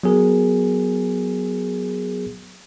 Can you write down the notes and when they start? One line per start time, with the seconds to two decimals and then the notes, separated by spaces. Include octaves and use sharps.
0.03 F#3 B3 G#4 A#4